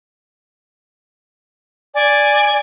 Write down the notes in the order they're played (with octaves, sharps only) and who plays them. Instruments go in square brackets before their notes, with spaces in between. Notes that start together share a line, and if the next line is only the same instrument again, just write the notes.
[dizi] D5 [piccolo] G#5